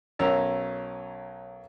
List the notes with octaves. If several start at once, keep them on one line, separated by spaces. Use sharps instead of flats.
B1 C#4 A#4 A#5 E6